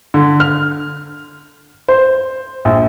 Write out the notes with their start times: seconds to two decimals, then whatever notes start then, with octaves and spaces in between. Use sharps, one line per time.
0.14 D3
0.40 F6
1.88 C5
2.65 A#1